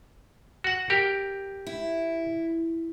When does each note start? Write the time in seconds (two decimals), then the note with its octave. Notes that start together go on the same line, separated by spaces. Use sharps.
0.64 F#4 F#5
0.90 G4 A#4
1.67 E4